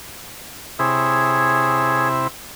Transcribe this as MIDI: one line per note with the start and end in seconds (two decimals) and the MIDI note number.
0.79 2.27 48
0.79 2.27 64
0.79 2.08 68
0.79 2.08 73